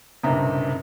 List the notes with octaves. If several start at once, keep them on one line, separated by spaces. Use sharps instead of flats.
F#1 B1 G2 C3 A#5